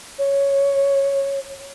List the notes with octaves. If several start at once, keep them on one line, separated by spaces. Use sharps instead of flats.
C#5